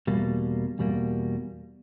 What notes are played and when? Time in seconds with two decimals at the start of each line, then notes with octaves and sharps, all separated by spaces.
0.07 E2 B2 G3 A#3
0.79 E2 B2 G3 A#3